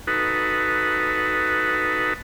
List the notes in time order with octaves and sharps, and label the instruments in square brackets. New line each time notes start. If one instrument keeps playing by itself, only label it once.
[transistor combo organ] D#4 F#4 A4 B4